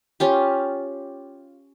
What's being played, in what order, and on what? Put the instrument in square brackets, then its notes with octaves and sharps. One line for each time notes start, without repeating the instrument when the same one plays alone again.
[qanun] C#4 F4 G4